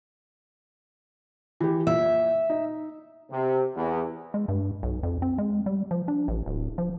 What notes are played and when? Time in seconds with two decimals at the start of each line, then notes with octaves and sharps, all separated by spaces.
1.60 E3 G4
1.87 A#2 E5
2.49 D#4
3.30 C3
3.75 E2
4.34 G#3
4.48 G2
4.83 B1
5.03 F2
5.22 C4
5.38 G#3
5.66 G3
5.91 F3
6.08 D4
6.28 A1
6.46 D1
6.78 F3